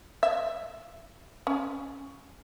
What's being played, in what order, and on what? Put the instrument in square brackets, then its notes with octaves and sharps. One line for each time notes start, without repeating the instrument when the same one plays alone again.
[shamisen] E5
C#4